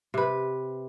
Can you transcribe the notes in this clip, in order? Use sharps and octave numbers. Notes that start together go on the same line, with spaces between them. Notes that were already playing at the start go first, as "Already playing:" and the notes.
C3 B4